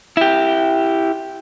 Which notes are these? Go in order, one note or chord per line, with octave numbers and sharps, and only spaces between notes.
E4 G4